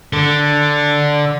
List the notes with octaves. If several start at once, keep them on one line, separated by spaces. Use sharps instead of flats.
D3